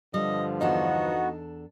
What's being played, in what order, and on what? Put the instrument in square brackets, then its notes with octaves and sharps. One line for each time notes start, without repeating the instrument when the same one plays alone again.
[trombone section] G2 D3 F3 [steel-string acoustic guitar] G3 [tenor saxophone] D#5
[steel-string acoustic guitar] E2 D4 A4 [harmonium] B3 F#4 [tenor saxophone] D#4